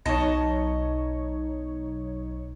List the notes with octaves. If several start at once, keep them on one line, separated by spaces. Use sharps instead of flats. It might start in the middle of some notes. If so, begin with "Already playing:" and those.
B1 D#4 C#5 D#5 A5